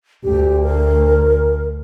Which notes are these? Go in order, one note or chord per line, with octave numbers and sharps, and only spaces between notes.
D2 G4
A#4